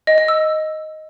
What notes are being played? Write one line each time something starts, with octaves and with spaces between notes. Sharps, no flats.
D#5
D#5
E6